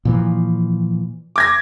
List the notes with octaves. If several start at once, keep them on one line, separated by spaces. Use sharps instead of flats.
A#2 E3 F3
D6 G#6 A#6